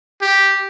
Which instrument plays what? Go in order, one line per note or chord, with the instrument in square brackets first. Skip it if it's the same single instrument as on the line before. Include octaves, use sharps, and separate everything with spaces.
[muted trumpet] G4